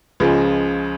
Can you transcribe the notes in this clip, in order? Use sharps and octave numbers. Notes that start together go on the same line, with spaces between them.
C#2 C#3 F3 G#3